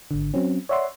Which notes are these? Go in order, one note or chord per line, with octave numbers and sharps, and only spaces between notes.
G#1 D3
F#3 C4 C#4
C#5 D5 E5 F#5 C6